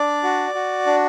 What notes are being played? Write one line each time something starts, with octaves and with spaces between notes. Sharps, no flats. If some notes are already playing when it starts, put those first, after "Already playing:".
Already playing: D4 D5
F#4
F#4
D4